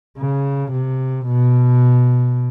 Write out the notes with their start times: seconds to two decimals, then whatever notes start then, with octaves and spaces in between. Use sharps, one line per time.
0.18 C#3
0.72 C3
1.27 B2